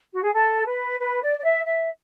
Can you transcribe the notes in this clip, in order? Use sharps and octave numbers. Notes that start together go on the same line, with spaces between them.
F#4
G#4
A4
B4
B4
D5
D5
E5
E5